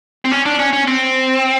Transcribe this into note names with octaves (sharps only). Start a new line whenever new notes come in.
C4
C#4
D4
C#4
C#4
C4